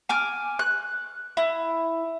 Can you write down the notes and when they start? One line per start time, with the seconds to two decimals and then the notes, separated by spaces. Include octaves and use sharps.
0.09 G#5 D6 F6
0.59 F#6
1.37 E4